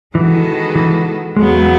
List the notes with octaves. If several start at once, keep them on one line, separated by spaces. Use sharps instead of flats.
D#3 E3 G#3 B3 F#4 A4
E3
E2 C#3 F#3 G#3 B3